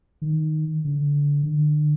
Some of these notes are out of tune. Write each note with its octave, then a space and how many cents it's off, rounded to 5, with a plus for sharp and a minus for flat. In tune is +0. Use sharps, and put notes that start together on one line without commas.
D#3 -5
D3 -25
D3 +35